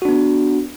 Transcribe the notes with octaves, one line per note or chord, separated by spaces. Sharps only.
B3 D4 F#4